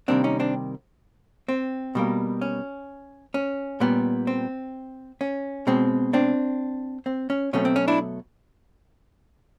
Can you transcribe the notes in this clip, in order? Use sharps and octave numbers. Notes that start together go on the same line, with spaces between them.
C3 D#3 G3 A#3 C4 D4
C#4 D#4
C4 D4
C4
B2 G3 A#3
C#4
C#4
A#2 G3 B3
C4
C#4
B2 G#3 C4
C4 D4
C4
C#4
B2 F#3 A3 C4 C#4
C4
C#4
D4 E4